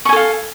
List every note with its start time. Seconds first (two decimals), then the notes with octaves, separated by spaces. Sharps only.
0.05 C#6
0.09 G#5
0.13 A4
0.16 F5